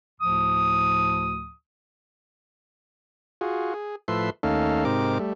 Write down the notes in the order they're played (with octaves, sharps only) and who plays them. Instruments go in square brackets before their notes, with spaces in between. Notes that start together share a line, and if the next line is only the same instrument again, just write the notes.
[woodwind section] D2 A2 F3 D#6
[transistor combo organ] F4 F#4 G#4
G#4
A2 F3 A4 B4 E5 C6
D#2 A3 C#4 D#4 A4 F5
G#2 C3 C4 D#4 A#4 D6
G3 A3